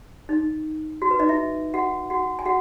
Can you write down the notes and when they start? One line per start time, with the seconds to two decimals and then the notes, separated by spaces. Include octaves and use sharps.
0.29 D#4
1.02 F#4
1.11 B4
1.19 D#4 D#5
1.29 E4 E5
1.74 F#4 F#5
2.10 F#4 F#5
2.39 G#5
2.45 F#4 F#5